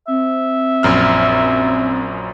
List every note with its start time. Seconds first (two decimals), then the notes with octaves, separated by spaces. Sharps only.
0.08 C4 E5
0.83 A#1 F#2 F6